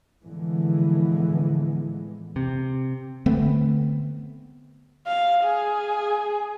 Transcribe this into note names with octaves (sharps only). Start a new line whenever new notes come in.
A2 D3 E3 F3 G#3 B3
C3
D3 A3 B3 C4
F5
G#4